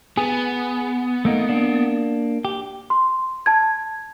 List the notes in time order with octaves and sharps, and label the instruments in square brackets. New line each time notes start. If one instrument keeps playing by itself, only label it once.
[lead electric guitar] B3 [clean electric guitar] G#4
[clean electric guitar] A3 A#3 D#4
A#3 D4
G4
[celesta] C6
A5 G#6